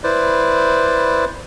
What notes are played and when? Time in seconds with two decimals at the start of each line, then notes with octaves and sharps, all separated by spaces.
0.04 E4 B4 C5 D5